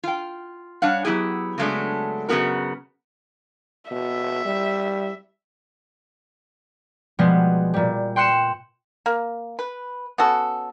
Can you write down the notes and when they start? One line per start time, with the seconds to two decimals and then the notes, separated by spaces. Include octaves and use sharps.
0.03 F4 G5
0.82 G3 D4 C#5 F5 F#5
1.05 F#3 B3 E4 G4 G#4
1.58 C#3 F#3 G#3 A3 B3 D4
2.29 F#2 C#3 G3 B3 F#4 A#4
3.91 B2 E5
4.45 G3
7.19 B2 F3 G3 G#3 B3
7.74 A#2 G3
8.16 G5 C6 F#6 C#7 E7
9.06 A#3
9.59 B4
10.18 B3 C#4 F#4 A4